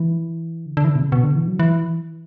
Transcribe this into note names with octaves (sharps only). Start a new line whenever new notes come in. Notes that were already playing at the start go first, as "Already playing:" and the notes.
Already playing: E3
D3
D3
E3
D3
B2
C#3
B2
D3
E3
F#3
E3